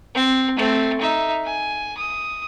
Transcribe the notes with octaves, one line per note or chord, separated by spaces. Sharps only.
C4
A3 C4
D#4 E5
G#5
D#6